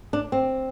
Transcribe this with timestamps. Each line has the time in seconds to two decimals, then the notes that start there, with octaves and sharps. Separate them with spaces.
0.13 D4
0.32 C4